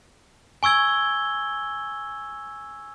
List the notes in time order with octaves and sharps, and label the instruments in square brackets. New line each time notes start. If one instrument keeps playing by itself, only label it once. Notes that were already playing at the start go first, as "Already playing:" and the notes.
[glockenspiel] G#5 C#6 E6 G#6 G7